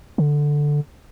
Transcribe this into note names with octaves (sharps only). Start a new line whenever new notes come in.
D3